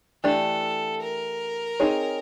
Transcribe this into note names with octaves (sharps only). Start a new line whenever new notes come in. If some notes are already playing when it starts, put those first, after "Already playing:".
E3 A3 D4 G4 A4
A#4
C4 D#4 G#4 C#5